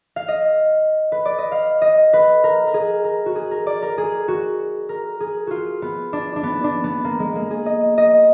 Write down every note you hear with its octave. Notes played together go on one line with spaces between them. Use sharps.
F5
D#5
B4
D5
D#5
F5
D#5
B4
A#4
A#4
G#4
A#4
F#4
G#4
A#4
D5
A#4
G#4
F#4
A#4
G#4
F4 F#4
B3
D4
D4
B3
D4
B3
A#3
G#3
A#3
G#4
D#5
D#5